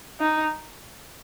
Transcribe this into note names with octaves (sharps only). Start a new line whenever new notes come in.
D#4